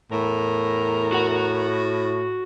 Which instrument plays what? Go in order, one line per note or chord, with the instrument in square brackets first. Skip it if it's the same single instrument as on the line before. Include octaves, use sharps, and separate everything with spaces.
[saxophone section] E2 A#4 [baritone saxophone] A2
[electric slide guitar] F#4 F#5